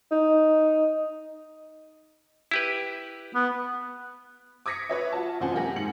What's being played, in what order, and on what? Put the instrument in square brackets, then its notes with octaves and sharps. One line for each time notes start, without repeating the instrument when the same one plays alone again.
[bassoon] D#4
[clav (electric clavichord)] E4 G4 B4
[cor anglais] B3
[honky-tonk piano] D6 D#6 G#6 A#6 B6 C#7
B4 C#5 E5
F4 F#4 A5
A1 C3 F4 C5 F#5 G#5
F#2 A#3 G4 F#5 G#5 A#6
G#2 C#7 F#7